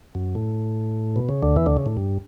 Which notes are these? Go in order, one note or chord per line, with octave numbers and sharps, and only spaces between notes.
F#2
A2
B2
C#3
D2 D3
E2 E3
D2 D3
C#3
A2
G2